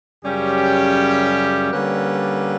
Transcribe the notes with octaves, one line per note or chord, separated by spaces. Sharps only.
F#2 C#3 G3 C#4 G4
D3 G3 A#3 C#4 B4